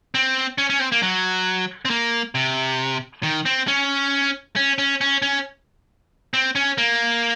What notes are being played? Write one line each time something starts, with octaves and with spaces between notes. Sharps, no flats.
C4
C#4
C#4
C4
A#3
F#3
C4
A#3
C3
D#3
C4
C#4
C#4
C#4
C#4
C#4
C4
C#4
A#3